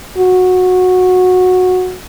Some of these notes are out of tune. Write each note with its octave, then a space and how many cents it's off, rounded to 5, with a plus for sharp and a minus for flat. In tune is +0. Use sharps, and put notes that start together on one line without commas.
F#4 -15